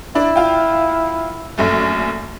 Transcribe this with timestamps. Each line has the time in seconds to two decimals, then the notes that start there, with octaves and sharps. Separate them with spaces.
0.15 D4 E4
0.36 F4 G5
1.58 A#1 F#2 A3